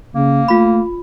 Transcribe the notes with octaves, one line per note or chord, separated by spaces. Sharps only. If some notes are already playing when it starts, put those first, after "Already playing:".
C#3 A#3
A3 F4 B5